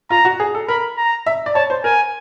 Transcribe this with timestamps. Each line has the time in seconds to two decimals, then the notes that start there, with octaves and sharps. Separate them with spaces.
0.10 F4 A#5
0.25 F#4
0.40 G#4
0.55 A4
0.68 A#4 B5
0.98 A#5
1.26 E5
1.46 D5
1.55 C#5 A5
1.70 C5
1.84 A#4 G#5